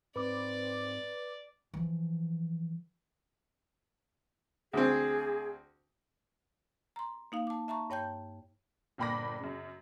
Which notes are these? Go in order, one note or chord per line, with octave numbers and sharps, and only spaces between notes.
G#2 C4 B4 D5 D6
E3 F3
D2 C4 G#4
A#5 C6
A#3 D#4 F5
A5 D6
E5 A5 A#5 C#6
G2 C#5 G5 A5 G6
G1 A#2 G5 B5 D6 A#6
F#2 C#3